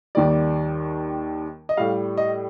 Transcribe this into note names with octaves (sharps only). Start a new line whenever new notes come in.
D#2 D#3 G3 D5
D#5
A2 G3 F5
D#5